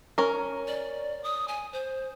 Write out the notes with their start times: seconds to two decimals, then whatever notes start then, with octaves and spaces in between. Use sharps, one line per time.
0.18 C#4 A#4
0.67 D5
1.24 D#6
1.48 G#5
1.73 C5